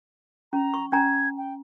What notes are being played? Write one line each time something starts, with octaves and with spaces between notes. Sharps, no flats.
C#4 A#5
C#6
C#4 G#5 A#5 G#6
G5